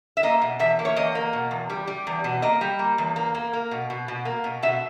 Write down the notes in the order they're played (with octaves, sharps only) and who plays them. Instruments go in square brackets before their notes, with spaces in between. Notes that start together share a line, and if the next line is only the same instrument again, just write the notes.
[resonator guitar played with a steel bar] E5
A#3 D#5
B2
E2 E5
A#3
C#5
E2 D#5
A#3
B2
E2
G3
G3
E2
B2
A#3 D#5
G3
A#3
E2
A#3
A#3
A#3
B2
B2
B2
A#3
B2
B2 E5